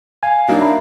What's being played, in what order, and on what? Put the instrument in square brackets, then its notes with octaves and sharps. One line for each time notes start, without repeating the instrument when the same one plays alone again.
[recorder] F5 [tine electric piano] G#5
[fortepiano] F#3 A#3 D#4 [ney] D4
[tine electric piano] E5 A#5 B5